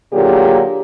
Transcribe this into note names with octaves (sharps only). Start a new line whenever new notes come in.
A#2 D3 F#3 A#3 G4 G#4